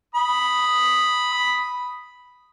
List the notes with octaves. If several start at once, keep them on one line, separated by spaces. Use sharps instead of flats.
B5 D#6